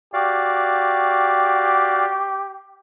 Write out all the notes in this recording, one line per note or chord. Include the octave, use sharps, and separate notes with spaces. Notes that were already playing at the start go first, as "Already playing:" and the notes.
F#4 G4 D5 F5